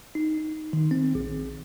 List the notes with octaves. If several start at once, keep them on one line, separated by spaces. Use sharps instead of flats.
D#4
D#3
C4
A#1